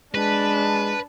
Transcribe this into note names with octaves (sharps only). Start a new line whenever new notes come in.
G#3 D4 B4 A5